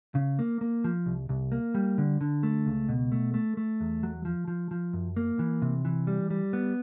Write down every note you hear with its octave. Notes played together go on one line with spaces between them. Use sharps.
C#3
A#3
A#3
F3
C2
C2
A#3
G3
D3
D3
A3
C#2
B2
A3
A3
A3
E2
F#3
F3
F3
F3
F#2
A#3
E3
C3
E3
G3
G3
B3